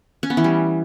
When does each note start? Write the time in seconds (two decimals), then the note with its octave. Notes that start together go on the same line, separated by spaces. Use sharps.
0.23 C#4
0.30 B3
0.37 E3
0.44 G3